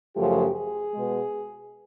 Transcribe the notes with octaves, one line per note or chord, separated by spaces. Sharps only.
F#2 C#3 F3 A3 G4
G#4
B2 G#3